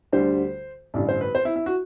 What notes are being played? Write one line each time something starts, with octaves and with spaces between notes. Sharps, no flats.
D2 D3 G3 C5
A1 G2 D3 D5
C5
B4
C5
E4
E4
F#4